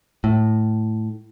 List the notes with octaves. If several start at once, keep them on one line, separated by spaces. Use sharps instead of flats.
A2